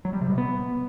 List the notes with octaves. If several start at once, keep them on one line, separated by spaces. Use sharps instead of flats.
F#3
G3
C3
B2
B3